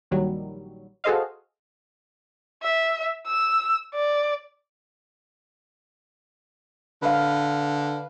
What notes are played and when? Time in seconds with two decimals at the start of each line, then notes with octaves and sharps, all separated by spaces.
0.11 A#1 D#3 F#3 G3
1.04 F#4 G#4 A4 C5 D#5 F5
2.63 E5
3.27 E6
3.95 D5
7.02 D3 B4 F5